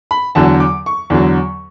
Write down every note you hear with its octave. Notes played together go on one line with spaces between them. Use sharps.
B5
E2 D3 F#3 A5
D6
C#6
E2 D3 F#3